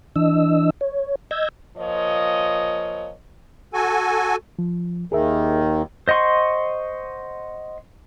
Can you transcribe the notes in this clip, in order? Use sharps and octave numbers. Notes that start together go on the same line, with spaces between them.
E3 D4 D#5 E6
C#5
D#5 E6 G6 G#6 A#6
A#2 F3 C#5 D#5
F#4 A4 G#5
F3
D#2 D#3 G#4 A#4 E5
C5 D#5 F#5 C6 C#6